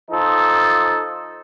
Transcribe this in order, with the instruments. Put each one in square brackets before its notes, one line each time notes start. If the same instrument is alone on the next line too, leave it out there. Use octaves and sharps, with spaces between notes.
[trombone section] F3 D#4 A4